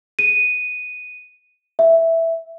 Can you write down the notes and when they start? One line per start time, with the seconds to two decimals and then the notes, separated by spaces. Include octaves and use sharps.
0.19 D#7
1.79 E5